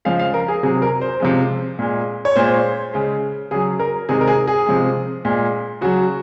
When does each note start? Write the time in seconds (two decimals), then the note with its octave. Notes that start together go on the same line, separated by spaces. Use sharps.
0.05 C#3 F3 G#3 F5
0.19 F5
0.34 A#4
0.48 G#4
0.63 C3 F#3 G#4
0.82 A#4
1.01 C5
1.20 C3 F3 G#3
1.79 A#2 G#3
2.25 C#5
2.36 A#2 G#3 C5
2.93 C#3 G#3
3.51 C#3 F#3 G#4
3.80 A#4
4.09 C3 D#3 G#3 G#4
4.21 A#4
4.27 G#4
4.47 G#4
4.66 C3 F3 G#3
5.25 A#2 G#3
5.81 C#3 F#3 F#4